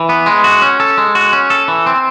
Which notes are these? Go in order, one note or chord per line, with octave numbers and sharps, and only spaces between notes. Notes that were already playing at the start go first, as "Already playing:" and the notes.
Already playing: E3
B3
G#3
F#4
C#4
A4
G#3
F#4
C#4
A4
E3
C4